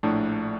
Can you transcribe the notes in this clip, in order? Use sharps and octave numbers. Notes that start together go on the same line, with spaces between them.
A#1 A2 A3 D4